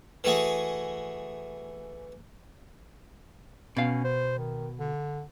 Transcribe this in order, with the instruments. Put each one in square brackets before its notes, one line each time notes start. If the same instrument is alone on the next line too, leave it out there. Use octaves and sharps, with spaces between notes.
[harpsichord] E3 A3 F#4 G#4
[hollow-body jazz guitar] B2 F5 [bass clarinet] C#4
[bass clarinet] C5
D#3
D3